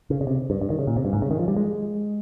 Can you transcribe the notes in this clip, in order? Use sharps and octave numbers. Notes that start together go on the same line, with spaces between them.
C#3
C#3
C3
G2
G2
D#3
C#3
A#2
C3
G2
G#2
C#3
D#3
F3
G3
G#3